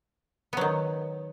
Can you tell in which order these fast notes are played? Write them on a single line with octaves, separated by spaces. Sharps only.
B3 F#3 D#3